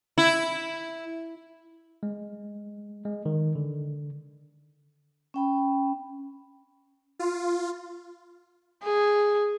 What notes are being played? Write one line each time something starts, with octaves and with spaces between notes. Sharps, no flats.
E4
G#3
G#3
D#3
D3
C#4 G5 B5
F4
G#4